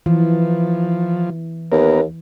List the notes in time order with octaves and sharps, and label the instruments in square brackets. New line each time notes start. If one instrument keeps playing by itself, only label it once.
[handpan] E3 [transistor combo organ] F3
[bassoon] D#2 [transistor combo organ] B3 A#4